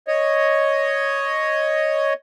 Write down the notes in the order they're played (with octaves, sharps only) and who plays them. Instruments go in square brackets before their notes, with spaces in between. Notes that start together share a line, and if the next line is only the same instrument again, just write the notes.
[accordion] C#5 D#5